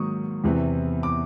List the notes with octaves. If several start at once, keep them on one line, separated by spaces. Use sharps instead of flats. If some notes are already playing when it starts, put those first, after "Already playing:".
Already playing: G#2 D#3 F#3 A#3 C#6 D#6
E2 C3 E3
D6